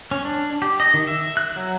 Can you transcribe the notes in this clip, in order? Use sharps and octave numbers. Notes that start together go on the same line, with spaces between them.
C#4
D4
G4
D#5
D#3
E5
F#6
F#3